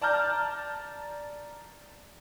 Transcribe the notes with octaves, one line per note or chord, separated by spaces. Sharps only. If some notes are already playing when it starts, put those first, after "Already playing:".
D5 A5 A#5 F6 G6